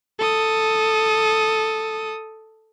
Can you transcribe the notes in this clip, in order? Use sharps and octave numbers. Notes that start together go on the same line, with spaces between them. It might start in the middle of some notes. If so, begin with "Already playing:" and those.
A4 D#6